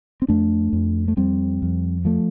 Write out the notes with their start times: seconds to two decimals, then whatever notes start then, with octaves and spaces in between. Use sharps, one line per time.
0.22 C4
0.28 F2 A3 D4
0.73 F2
1.08 A3
1.17 F2 G3 C4
1.62 F2
2.05 F3 A3